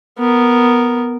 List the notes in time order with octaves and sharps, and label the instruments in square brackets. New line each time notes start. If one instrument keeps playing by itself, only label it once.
[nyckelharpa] B3 A#4